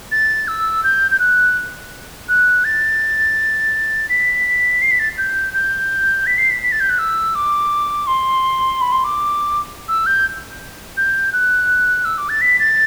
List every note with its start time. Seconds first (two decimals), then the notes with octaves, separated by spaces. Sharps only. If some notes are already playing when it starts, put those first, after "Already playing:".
0.12 A6
0.48 E6
0.84 G6
1.11 G6
1.19 F#6
2.29 F#6
2.65 A6
4.09 B6
4.82 C7
4.91 B6
4.99 A6
5.18 G6
5.54 G6
6.27 B6
6.38 C7
6.50 B6
6.62 B6
6.72 A6
6.80 G6
6.89 F#6
6.99 E6
7.35 D6
8.07 C6
8.81 B5
8.92 C6
9.04 D6
9.88 E6
10.06 G6
10.97 G6
11.33 F#6
12.05 E6
12.18 D6
12.29 A6
12.41 B6
12.59 A6